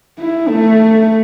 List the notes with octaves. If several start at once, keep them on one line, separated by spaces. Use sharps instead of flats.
E4
A3